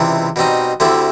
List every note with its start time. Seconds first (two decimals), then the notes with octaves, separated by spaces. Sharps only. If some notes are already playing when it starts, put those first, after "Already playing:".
Already playing: C#2 C3 E3 G3
0.36 B2 G3 C4 D#4
0.80 D2 D3 G3 C4 E4